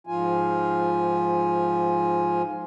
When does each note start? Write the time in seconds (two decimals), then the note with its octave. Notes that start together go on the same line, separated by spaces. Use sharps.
0.07 G#2 F3 F4 G#5